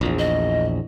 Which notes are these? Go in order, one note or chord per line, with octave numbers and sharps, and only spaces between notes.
A#1 E2
D#5